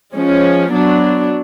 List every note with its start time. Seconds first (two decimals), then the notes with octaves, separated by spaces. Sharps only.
0.15 F3 G#3 C#4
0.71 F#3 B3 D4